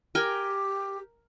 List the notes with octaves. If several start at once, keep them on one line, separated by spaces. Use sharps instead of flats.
G4 A#4 G5 G#5